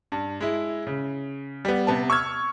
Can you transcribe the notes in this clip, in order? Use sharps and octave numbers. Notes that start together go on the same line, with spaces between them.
G2
G#3 E4
C#3
G3 B3
C3 B3 A5
C#6 E6 F6 G#6